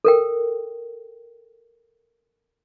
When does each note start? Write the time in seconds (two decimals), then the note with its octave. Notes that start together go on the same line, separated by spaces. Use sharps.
0.05 A4 A#4 G5